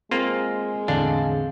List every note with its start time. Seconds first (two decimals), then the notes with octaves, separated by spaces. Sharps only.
0.11 G#3 A#3 C4 F4
0.88 E2 A2 D3 C4 D4 A4 F5